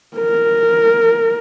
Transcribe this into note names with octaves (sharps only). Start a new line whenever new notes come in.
A#4